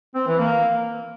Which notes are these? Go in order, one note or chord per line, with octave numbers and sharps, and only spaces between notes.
C4
E3
A#3